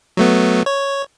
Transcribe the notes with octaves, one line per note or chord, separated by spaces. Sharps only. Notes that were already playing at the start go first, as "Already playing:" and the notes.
F#3 A3 B3
C#5